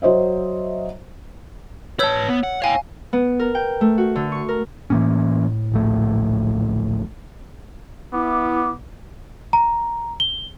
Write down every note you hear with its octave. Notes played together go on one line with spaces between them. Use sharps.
F#3 C5 D#5 E5
B4 C#5 A5 E6 G6
B3
F#5
C#5 F5 G5 G#5
B3
A#4
G5
A3
F#4
D3
C#6
A#4
A2 E3 A#3 C#4
D1 A#1 A3
B3 E4 D6
A#5
G7